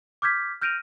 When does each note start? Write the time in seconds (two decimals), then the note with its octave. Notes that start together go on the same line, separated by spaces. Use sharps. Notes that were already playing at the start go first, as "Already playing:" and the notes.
0.22 D6 F6 G6 G#6 B6
0.62 F6 G6 A#6 D7 D#7 F7